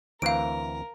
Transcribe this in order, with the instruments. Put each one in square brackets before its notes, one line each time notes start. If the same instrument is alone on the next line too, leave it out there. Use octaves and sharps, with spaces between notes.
[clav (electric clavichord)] D2 E3 C4 [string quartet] A#4 [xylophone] F5 D7